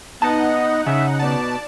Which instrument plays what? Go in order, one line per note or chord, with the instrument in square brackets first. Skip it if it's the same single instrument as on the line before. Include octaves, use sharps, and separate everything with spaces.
[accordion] B3 D#5 [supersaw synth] D#4 F#5 [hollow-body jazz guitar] A5
[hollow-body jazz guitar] C#3 [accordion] E5
[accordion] B2 [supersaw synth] D5 A5